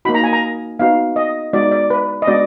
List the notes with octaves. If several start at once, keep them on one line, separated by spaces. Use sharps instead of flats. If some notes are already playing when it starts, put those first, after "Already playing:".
A#3 D#4 F#4 B5
A#5
G#5
A#5
B3 D#4 F#4 F5
D#5
G#3 B3 D#4 F#4 D5
D5
B4
D#5
G#3 B3 D4 F#4 D5